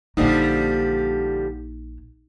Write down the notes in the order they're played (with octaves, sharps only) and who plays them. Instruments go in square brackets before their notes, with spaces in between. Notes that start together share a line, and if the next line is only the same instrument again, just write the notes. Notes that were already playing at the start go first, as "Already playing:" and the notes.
[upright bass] A#1 A#3 [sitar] D3 F3 G3 [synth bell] D#4